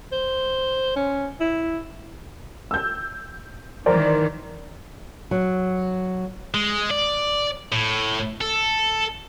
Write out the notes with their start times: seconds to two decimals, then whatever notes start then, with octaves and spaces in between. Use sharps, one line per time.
0.12 C5
0.96 C#4
1.40 E4
2.71 E6 G6
3.86 D#3 E3 A#4 C5 D5
5.31 F#3
6.54 G#3
6.91 D5
7.72 A2
8.41 A4